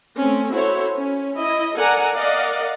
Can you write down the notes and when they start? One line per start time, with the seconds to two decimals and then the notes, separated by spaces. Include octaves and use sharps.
0.16 A3 C4 C#4
0.53 E4 F#4 A4 C5 C#5
0.95 C#4
1.38 E4 D#5
1.76 A4 A#4 D5 F#5 G#5 A#5
2.14 A#4 D5 D#5 F5 F#5